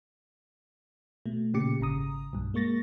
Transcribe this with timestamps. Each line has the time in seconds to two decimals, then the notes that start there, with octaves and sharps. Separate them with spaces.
1.26 B2 A3
1.54 A#2 C#3 G4 D6 C#7
1.80 G#1 C#3 A#5 D#6
2.33 B1 G2
2.54 G#3 A#3 C#6 A6 A#6